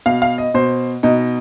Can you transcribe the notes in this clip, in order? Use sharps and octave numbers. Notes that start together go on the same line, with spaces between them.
B2 F5
F5
D#5
B2 C5
B2 D#4